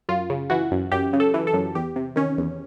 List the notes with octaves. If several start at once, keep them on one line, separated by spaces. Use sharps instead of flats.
F#2 F4
C#3
E3 F#4
F#2
F#2 G4
C#3
A4
E3
A4
F#2
E2 G4
C3
D#3 C#4
E2